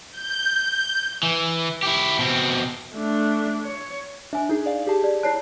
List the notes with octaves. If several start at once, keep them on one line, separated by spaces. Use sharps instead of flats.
G6
E3
E4 G4
B2 C4
A3 D4
C#5
D4 E5 G#5
D#4 G#4
D5 F5
G4 G#4 A5
D5
E4 C#5 A5 F#6 C7